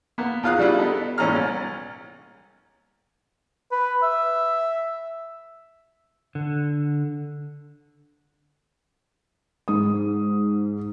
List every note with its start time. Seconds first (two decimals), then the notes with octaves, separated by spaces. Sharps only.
0.18 A#3 B3
0.43 E2 F4 F5 D#6 F#6
0.58 C#3 G3 D4 E4 F4
0.78 B3 D#4 A4
1.18 G#1 A#2 E3 C#4 A#5 F6
1.35 C2
3.72 B4
4.03 E5
6.35 D3
9.68 G#2 D#6